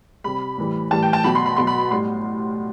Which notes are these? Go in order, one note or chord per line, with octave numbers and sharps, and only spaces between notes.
C3 G3 B5
A2 E3 G3
A2 E3 G3 A5
G5
A5
B2 F#3 B5
C6
B5
B2 F#3 C6
B5
A2 G3 C6